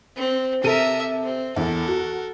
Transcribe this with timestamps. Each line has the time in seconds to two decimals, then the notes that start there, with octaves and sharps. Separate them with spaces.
0.16 C4
0.63 C3 A4 A#4 E5 D#7
1.24 C4
1.56 E2 A4 A#4
1.87 F#4